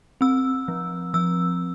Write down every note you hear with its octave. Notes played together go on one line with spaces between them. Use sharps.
C4 E6
F3
F3 E6